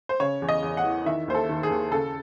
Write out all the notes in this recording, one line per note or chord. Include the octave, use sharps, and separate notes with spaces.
C5
C#3 C#5
E2
D#5
E2
F#5
E3
D#3 E5
D#2 C5
A4
D#3
G#4
D#2
C#3 A4